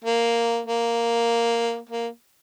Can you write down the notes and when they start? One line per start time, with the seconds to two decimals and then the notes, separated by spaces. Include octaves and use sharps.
0.04 A#3
0.67 A#3
1.89 A#3